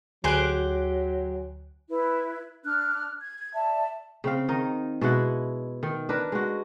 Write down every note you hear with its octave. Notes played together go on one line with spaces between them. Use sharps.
D2 F#3 G4 G#4 C5 F#6 D7
E4 B4
D4 F6 F#6
G#6
G#6
D5 E5 A5
C#3 C4 F5
D#3 D#4 A#4
B2 G#3 E4 F#5
D#3
D4 A#4 B4
G#3 F#4